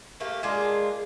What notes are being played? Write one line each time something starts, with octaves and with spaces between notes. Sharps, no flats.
A3 A#3 G4
G#3 A#3 D4 F4